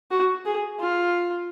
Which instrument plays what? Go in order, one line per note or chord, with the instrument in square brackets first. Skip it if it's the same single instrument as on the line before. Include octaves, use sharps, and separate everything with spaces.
[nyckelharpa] F#4
G#4
F4